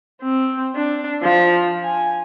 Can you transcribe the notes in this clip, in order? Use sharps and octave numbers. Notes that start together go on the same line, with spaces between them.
C4
D4
F3
G#5